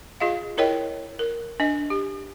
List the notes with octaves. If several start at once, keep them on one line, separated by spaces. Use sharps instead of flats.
F4 G#4 D#5 F5
E4 A#4 C#5 D#5 G5
A#4
D4 D#5
G4